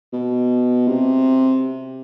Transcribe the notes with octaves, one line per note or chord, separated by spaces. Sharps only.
B2
C3